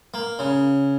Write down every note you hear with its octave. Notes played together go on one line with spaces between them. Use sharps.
A#3
C#3